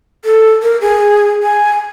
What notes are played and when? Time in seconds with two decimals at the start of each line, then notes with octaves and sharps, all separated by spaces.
0.25 A4
0.63 A#4
0.81 G#4
1.43 G#5